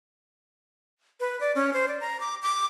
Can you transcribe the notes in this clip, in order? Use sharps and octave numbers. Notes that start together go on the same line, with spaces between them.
B4
D5
C#4
C5
D5
A#5
D6
D6